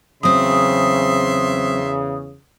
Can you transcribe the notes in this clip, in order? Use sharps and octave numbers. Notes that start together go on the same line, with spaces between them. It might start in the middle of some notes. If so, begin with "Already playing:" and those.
E2 C#3 F#3 C4 E5 C6 D#6